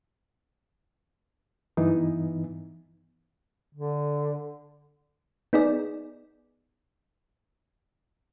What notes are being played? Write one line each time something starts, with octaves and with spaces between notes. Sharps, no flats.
G2 E3 B3 D#4
D3
B3 D#4 G#4 D5